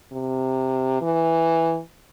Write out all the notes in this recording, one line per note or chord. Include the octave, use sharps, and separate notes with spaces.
C3
E3